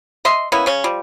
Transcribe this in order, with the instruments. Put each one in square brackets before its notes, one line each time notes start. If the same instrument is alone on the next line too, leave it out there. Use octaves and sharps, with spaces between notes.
[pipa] D#5 E5 C6
A#3 B3 C#4 E4
C#3 C#4
F3 G3